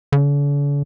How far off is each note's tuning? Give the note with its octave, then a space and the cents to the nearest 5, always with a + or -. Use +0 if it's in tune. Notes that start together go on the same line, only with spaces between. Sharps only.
D3 -45